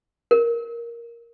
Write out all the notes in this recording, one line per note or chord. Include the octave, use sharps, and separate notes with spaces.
A#4